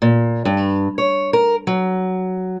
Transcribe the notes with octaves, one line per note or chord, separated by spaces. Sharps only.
A#2
G2
C#5
A#4
F#3